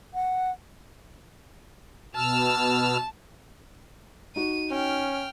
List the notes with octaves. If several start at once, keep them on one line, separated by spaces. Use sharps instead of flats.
F#5
B2 A5 E6 F6
D#4 F#4 D#7
C#4 G5 F6